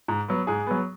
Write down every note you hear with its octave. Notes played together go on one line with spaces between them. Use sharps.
G#2
F#3 B3
G#2 G#4
F#3 B3